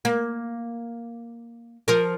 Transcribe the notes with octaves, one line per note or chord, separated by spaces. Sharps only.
A#3
F3 A#4